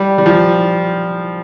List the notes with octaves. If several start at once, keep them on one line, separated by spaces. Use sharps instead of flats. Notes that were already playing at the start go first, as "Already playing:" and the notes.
Already playing: G3
G3
F3